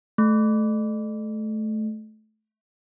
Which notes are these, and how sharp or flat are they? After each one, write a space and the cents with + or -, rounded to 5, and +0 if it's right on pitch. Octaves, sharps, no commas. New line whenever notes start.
A3 -20